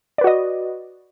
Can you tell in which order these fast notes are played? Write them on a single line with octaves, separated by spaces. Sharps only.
D5 B4 F#4 D#5